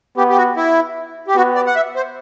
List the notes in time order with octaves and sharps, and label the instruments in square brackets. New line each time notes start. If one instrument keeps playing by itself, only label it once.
[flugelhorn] B3 [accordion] G4
[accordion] G4
F#4
E4
G4
[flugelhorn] B3 [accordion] F#4
[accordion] D5
F#5
E5
C5